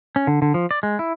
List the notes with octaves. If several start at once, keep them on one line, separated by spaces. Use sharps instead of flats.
C#4
D3
D3
F3
D5
G#3
E4